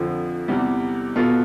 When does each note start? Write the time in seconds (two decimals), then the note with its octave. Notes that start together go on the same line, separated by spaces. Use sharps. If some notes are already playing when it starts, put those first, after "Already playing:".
Already playing: F2 D3 F3
0.48 E2 C3 G3
1.16 B2 B3 F4 A4